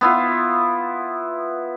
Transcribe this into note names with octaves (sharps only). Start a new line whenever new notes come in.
B3 E4 F4